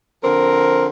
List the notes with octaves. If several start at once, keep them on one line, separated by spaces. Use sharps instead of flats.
D3 F3 C4 A#4